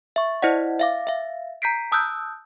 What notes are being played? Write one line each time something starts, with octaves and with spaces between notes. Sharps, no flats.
E5 C#6
E4 C5 D5 D#5 F#5
E5 F5 D6
E5 F5
A#5 G6 B6 C7 D7
A5 D#6 E6 F#6 G6